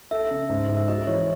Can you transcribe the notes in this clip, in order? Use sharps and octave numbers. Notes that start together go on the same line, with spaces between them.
A4 E5
C#3
G#2
G#2
E5
F#4 D#5
E3 C#5